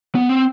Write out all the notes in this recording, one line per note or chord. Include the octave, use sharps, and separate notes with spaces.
B3
C4